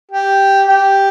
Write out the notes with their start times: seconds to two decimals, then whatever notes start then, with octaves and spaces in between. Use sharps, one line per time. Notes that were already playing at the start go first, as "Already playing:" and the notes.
0.11 G4
0.68 G4